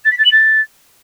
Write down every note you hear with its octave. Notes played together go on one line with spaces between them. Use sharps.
A6
B6
A6
F#7
A6